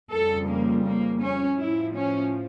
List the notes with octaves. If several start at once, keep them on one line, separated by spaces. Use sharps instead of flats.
F2 C#3 G3 A4
A#3
A#3
C#4
A2 F3 E4
C#4